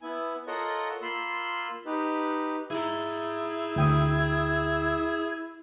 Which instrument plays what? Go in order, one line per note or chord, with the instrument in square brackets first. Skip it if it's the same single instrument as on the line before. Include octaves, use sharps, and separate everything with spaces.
[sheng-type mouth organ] B3 E4 G#5
F4 A4 A#4 C#5 D#5 F#5
A#3 F4 B5 C6 E6
D#4 G4 B4
[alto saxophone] E4 [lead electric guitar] G#4 A#5
[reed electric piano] D2 G5 D#6 [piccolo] G#6